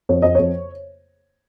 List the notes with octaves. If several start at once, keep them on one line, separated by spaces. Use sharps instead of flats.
F2 C#5
F2 D#5
F2 C#5